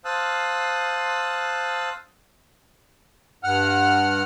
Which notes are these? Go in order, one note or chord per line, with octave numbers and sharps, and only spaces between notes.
C5 F5 A5 D#6 E6 F#6
G2 F#5 F6